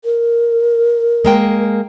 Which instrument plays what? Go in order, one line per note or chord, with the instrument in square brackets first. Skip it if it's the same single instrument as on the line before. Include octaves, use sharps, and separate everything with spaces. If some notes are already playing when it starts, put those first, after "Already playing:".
[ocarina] A#4
[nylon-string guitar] G#3 A#3 G5